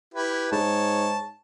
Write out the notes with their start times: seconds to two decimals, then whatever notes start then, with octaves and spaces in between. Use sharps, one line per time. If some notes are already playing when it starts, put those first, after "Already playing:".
0.14 E4 G4 B4
0.52 G#2 C#5 A5